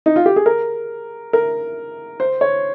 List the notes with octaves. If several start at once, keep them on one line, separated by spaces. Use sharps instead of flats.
D#4
F4
G4
G#4
A#4
A#4
C5
C#5